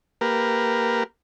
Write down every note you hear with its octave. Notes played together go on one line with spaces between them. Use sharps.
A#3 G4 A#4 B4